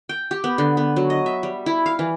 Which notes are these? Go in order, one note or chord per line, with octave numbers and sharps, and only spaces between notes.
G5
G4
B3
D3
B3
F#3
D#5
E5
G3
E4
F5
E3